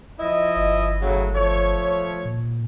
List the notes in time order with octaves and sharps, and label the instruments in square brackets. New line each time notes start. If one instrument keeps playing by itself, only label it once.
[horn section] F3 E4 D#5
[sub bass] G1
[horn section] A2 C#3 F#3
F3 A3 C#5
[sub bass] A#2